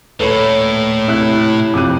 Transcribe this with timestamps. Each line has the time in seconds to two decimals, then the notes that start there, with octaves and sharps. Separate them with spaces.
0.20 D#1 A2 A4 B4 C#5 B5
1.08 C3 E4 F#6
1.74 F2 C3 D6 F#6 D#7